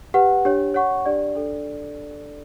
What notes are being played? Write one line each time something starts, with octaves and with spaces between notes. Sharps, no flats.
G4 B4 F#5
D4 G4 C#5
C#5 F#5 C#6
D4 G4 D5
D4 A4 D5